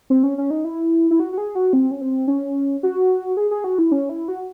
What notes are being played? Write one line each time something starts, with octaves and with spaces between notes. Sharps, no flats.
C4
C#4
C#4
D#4
E4
E4
F#4
F#4
G#4
F#4
C4
C#4
C4
C#4
F#4
G#4
G#4
F#4
E4
C#4
E4
F#4